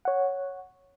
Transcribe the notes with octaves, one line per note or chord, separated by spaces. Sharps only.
C#5 F#5